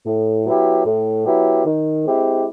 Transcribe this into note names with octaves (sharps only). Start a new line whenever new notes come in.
A2
F#3 B3 E4 G4
A2
F#3 B3 E4 G4
D#3
G#3 C4 E4 G4